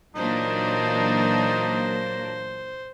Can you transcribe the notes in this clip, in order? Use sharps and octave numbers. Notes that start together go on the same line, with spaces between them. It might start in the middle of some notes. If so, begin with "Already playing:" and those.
A#2 E3 F#3 A#3 D4 D#4 C5